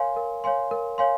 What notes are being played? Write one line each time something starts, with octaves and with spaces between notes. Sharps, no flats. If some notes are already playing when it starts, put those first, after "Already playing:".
Already playing: A#4 C#5 F5 G#5 C6
A#4
C#5 F5 G#5 C6
A#4
C#5 F5 G#5 C6